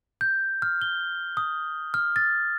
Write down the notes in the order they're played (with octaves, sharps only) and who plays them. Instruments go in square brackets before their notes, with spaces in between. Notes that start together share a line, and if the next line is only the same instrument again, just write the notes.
[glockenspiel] G6
F6
G7
D#6
F6
A6